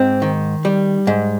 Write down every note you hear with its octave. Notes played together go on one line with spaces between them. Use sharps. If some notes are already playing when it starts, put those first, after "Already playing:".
Already playing: G#2 C4
D#3
G3
G#2